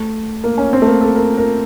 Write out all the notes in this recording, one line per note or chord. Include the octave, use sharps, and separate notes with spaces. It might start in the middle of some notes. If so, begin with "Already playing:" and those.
Already playing: A3
A#3
C#4
C4
A3
A#3
A4
A#4
A#4